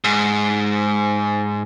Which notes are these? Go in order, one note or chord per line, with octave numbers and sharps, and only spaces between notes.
G#2